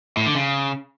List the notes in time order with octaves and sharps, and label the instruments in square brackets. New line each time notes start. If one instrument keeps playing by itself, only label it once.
[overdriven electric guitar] A2
D3
C#3